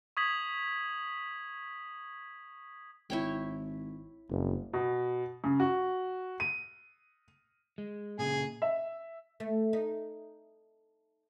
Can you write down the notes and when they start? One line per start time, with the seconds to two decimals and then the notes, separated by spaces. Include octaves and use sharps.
0.17 C#6 D#6 G#6 B6 F#7
3.10 G#1 E4 C#5 G5
4.30 F#1 C2
4.73 B2
5.44 C#3
5.60 F#4
6.40 D#7
7.78 G#3
8.19 A#2 C#3 G#4
8.62 E5
9.40 A3
9.73 D#4